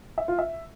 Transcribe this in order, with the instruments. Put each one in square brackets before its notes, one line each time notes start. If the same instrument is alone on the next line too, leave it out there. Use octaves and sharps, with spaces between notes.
[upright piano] E5
F4
E5